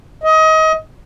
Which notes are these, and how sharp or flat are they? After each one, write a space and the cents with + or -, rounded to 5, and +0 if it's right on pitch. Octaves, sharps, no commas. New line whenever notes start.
D#5 +25